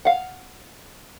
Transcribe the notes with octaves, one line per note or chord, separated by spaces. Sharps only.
F5 F#5